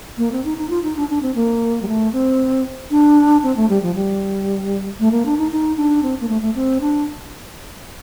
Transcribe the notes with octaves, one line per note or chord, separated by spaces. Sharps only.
A#3
C4
D#4
D#4
F4
D#4
D4
D4
C4
A#3
G3
A3
C4
D4
C4
A3
G3
F3
G3
A3
A#3
D4
D#4
D#4
D4
C4
A#3
A3
A3
C4
D4